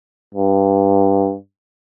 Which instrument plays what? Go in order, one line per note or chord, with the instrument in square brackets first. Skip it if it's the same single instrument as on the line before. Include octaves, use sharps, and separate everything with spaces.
[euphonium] G2